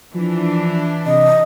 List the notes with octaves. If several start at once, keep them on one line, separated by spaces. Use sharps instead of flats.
E3 F3 D4
C3 D#5